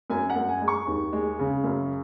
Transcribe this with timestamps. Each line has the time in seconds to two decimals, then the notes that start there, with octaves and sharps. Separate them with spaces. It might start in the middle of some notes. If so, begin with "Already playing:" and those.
0.10 F#2 G#5
0.30 F#5
0.36 F#2
0.49 G#5
0.61 G#3
0.68 C#6
0.87 D#2
1.13 G#3
1.39 C#3
1.64 F#2